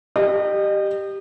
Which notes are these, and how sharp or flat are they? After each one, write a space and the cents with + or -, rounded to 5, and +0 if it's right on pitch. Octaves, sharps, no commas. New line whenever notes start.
G4 +0 D#5 -35